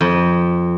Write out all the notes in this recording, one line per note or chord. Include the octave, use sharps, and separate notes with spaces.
F2